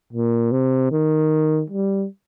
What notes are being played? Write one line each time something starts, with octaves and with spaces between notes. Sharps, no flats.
A#2
C3
D#3
G3